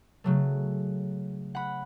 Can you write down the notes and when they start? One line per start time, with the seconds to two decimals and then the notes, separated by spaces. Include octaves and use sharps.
0.24 C#3 F#3 A3
1.55 F#5 B5